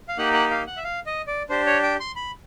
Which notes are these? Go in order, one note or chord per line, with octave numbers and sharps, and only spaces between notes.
F5
A#3 D#4 G4 F#5
F#5
F5
F#5
E5
F5
D#5
D5
D4 G4 C5
C#5
G5
C6
B5